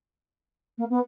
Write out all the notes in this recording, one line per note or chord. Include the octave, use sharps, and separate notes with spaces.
A#3
B3